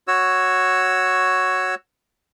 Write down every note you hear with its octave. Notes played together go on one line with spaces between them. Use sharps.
F#4 C#5 E6